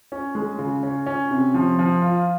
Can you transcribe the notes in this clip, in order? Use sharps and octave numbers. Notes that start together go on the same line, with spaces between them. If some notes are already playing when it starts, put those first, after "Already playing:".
C#4
G#3
C#3
C#4
C#4
C3
F3
F3
F4